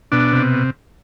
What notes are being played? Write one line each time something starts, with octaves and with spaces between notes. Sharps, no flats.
B2 D4
C3